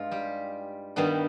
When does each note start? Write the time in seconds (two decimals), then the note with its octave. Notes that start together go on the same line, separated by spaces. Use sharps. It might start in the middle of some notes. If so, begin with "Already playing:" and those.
Already playing: G2 G#3 D#4 F4
0.11 G3 G4
0.96 G2 D#3 G3 B3 D4